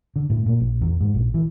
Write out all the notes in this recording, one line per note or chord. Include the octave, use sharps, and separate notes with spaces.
D3
A2
A#2
A#1
E2
G#2
A#1
E3